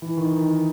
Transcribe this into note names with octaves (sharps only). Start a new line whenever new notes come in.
E3
D#3
D#3